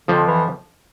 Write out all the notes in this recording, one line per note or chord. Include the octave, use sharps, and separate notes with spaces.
F2 D3 F3
E3